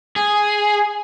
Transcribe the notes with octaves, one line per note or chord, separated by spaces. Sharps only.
G#4